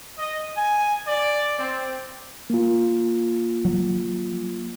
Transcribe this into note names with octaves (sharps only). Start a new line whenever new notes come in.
D#5
G#5
D5
C4
A#3 F4
F#3